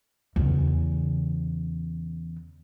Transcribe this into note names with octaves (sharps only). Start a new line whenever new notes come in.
E2 C#3